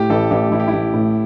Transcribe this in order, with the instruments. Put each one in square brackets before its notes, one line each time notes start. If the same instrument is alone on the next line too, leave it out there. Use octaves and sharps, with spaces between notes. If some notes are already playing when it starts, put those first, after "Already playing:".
Already playing: [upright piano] A2 [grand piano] G4
[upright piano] A1 [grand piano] A4
[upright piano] A1 [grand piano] G4
[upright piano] A1 [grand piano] E4
[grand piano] G4
E4
[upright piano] A1
A2